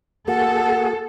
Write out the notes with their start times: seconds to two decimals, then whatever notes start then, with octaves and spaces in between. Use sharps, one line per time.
0.28 A#3 F#4 G#4 A4 F#5